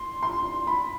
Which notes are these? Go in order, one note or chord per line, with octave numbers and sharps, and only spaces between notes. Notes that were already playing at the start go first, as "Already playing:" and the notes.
Already playing: C6
C6
B5